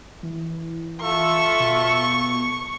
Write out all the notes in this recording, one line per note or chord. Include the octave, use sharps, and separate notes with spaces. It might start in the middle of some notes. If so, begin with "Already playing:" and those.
E3
F4 A4 E5 C#6
B2